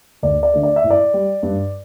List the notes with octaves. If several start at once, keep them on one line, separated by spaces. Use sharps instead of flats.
D2 D5
D5
D3 A3
D5
E5
A2
D5
G3
G2